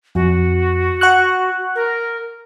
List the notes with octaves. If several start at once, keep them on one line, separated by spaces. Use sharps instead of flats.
F2 F#4
F#5 C#6 F#6
A#4